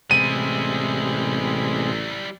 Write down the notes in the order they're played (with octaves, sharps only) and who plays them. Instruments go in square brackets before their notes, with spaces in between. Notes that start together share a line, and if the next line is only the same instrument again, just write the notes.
[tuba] A1 [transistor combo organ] C3 G#3 [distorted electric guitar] G3 E4 [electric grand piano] D#7